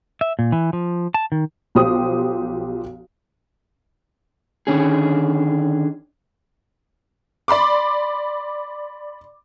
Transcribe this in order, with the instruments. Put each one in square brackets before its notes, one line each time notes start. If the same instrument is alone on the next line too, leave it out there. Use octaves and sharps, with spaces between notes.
[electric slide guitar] E5
A#2
E3
F3
A5
D#3
[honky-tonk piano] B1 F3 G4 C5 D#6
[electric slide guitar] D3 D#3 C#4 G#4
[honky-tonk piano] D5 B5 C6 D6